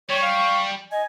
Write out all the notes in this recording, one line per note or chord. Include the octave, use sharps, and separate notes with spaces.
G3 C#5 C#6
F5
D#5 G#5